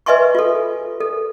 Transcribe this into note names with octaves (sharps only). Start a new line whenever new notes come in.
B4 D#5 E5 G#5 C6 C#6
F4 A4
A4